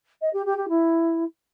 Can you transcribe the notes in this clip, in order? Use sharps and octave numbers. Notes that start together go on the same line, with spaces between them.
D#5
G4
G4
G4
E4